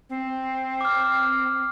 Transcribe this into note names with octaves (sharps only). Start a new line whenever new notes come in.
C4
D6 F6